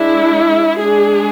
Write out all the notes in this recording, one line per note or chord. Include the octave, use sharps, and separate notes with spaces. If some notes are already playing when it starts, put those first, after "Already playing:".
Already playing: G#3 D4 E4
G#3 D4 G#4